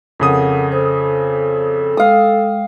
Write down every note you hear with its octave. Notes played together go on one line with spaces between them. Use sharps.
F2 C#3 A4 A#4 F#5 D#6
A4 C5
G#3 F5 G5 D#6